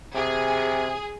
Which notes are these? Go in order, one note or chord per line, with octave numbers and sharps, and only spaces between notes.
C3 G#4